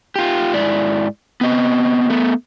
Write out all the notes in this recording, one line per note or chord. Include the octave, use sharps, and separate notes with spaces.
F4 G4
G#2 E4 D5
B3 C4 D#5
A3 B3